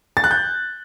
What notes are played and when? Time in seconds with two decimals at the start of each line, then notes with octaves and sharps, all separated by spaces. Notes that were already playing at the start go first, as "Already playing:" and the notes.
0.17 A6
0.24 F#6
0.31 G6